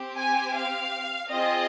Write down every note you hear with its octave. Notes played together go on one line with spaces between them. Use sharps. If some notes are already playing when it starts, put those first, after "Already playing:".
Already playing: C4 G4
G#5
F5
C4 F4 G#4 D#5